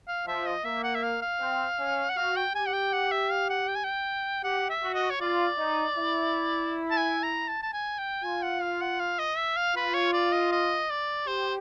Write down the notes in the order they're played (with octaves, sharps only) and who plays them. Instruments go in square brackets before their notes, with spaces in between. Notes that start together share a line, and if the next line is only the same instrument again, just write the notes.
[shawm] F5
[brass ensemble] F3 [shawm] E5
[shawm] D#5
[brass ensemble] A#3 [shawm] E5
[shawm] F#5
E5
F5
F5
[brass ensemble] C4
C#4
[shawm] F#5
[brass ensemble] F#4 [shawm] F5
[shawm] G5
[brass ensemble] G4 [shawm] G#5
[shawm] F#5
G5
F#5
E5
F5
F#5
G5
G#5
G5
[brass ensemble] G4 [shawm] F#5
[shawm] E5
[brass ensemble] F#4
[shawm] D#5
C#5
[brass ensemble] F4 [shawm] D5
[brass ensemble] D#4
E4
[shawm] A5
G#5
A#5
A5
A5
G#5
G5
[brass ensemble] F4 [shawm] G#5
[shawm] F#5
F5
F#5
F5
D#5
E5
F5
[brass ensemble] F4 [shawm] B4
[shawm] C#5
D5
D#5
D#5
D5
[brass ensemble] G4 [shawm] C5